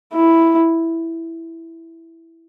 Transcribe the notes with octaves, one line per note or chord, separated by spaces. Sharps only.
E4